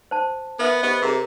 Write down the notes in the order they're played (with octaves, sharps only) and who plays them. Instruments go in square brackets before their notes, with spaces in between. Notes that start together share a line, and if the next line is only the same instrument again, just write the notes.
[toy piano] C5 A5
[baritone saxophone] B3 [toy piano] A#4 B4 E5
[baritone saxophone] B3 [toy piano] G4 C5 D#5
[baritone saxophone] C3 [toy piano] G#4 A#4 A#5